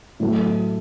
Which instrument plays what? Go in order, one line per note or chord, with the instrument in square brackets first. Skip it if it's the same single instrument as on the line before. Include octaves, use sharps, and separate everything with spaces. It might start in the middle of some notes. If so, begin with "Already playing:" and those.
[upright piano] A2 F#3 A3